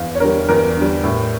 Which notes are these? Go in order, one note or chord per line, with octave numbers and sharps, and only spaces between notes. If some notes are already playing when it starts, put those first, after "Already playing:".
Already playing: E2 F5
C#5
D3 G3 A#4
E2 A#4
D3 G3
A2